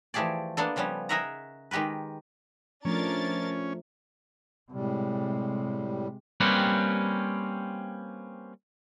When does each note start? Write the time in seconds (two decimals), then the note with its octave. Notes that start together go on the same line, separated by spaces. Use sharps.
0.14 E3 F3 A3 G4 G#4 D5
0.57 A#3 B3 D4 A4
0.76 C#3 F3 G3 B3 C#4
1.09 G#4 A#4 D#5 E5 F#5 A#5
1.71 D#3 G#3 G4 A#4 B4
2.85 F3 A3 C#4 D4 A#4 A6
4.72 A2 C3 G3 G#3
6.40 G3 A#3 C4 C#4 G4 B4